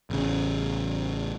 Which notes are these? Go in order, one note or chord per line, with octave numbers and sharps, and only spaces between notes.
A1 C#3